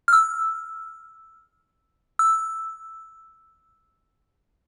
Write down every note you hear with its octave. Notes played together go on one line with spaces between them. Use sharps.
F6
E6
E6